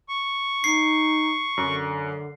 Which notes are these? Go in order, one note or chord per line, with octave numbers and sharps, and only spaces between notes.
C#6
D#4 C7
F#2 D3